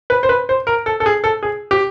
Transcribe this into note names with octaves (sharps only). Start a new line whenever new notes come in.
B4
C5
B4
C5
A#4
A4
A4
G#4
A4
G#4
G4